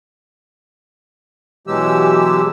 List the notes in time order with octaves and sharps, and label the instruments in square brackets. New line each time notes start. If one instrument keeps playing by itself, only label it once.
[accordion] B2 E3 F#3 G#3 G4 E6